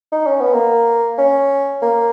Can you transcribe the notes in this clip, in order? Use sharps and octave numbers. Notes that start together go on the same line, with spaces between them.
D#4
C#4
B3
A#3
C#4
A#3